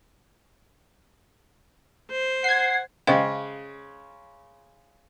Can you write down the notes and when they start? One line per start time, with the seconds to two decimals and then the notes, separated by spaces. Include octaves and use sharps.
2.11 C5
2.44 F#5 G#6 C7
3.07 C#3 G#3 C5 F5 G5